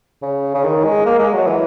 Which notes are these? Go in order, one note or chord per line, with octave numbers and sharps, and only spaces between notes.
C#3
C#3
D#3
G#3
A#3
G#3
F#3
E3